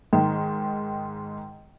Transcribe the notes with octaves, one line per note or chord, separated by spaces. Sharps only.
G#2 D#3